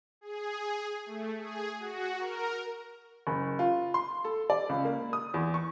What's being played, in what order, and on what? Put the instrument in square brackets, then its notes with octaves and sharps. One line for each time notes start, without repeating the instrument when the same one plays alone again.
[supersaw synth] G#4
A3
G#4
F#4
A#4
[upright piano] F#1
F4
C6
A4
D5
C#2
A#3
D#6
E2
C#6